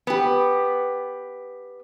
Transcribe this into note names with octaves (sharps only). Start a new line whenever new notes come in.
B3 G4